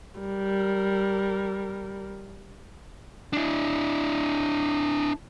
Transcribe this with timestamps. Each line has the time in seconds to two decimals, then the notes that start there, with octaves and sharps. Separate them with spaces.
0.19 G3 A#4
3.33 D4 E4